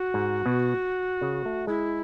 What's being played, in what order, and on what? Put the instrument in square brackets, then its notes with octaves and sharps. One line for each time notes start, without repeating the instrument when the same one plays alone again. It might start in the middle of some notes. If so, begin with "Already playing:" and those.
Already playing: [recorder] F#4
[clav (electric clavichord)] G#2
B2
C#3
A3
[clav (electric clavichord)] G#3 [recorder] E4